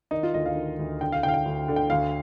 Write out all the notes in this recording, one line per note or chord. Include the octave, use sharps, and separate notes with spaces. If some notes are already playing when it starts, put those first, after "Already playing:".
D#3 D#4
F4
D2 D#5
F5
D#3
D2
D3 G5
F5
D3 G5
F5
G5
D2
D3
G5
D2 F5